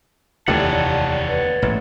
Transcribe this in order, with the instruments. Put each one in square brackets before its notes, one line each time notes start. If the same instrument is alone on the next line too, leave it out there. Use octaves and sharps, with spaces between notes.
[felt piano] F1 [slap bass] D#2 C3 E3 [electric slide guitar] C#5 D5 F#5 [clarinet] A5
[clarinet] B4
[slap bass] A1 G#2